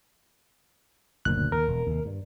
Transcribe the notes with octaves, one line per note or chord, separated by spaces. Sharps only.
F#1 D2 A#2 F#6
D#2 A#4
E1
D#2 C3
G2